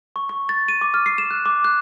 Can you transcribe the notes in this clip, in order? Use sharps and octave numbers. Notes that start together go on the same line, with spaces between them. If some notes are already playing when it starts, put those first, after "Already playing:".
C#6
C#6
A6
D#7
D6
F6
C7
E7
F#6
D6
F#6